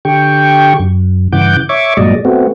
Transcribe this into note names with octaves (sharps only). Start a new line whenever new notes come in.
D3 G4 G5 C#6
F#2
G2 C#3 E3 F#5 D6 G6
C#5 E5 C#6 D6
G2 A#2 F#3 G#3 D5 D#5
A3 B3 C4 F#4